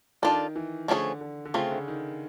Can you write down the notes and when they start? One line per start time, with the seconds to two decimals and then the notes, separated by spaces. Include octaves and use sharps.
0.22 D#3 D4 F4 A4
0.56 E3
0.88 D3 F3 A3 C#4 E4 G#4
1.21 D3
1.45 D3
1.54 C#3 A3 C4 F4
1.71 D3
1.88 D#3